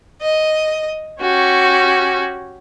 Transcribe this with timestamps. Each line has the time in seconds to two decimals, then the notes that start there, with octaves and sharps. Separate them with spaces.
0.22 D#5
1.21 C#4 F#4 G4